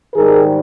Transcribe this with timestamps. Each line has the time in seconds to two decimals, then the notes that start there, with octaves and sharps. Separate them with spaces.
0.13 G#2 D#3 G3 G#4 A#4